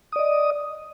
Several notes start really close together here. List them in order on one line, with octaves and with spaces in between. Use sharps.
D#6 D5 D#5